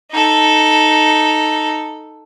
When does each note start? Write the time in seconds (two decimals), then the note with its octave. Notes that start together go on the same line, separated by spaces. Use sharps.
0.12 D#4 A4